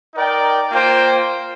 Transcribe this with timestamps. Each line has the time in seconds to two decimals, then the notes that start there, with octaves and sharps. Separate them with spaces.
0.15 D#4 A#4 D5 G5
0.72 A#3 F4 C5 G5